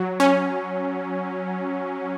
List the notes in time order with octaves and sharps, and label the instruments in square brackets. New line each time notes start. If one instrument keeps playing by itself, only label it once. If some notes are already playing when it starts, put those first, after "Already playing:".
Already playing: [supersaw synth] F#3
C#4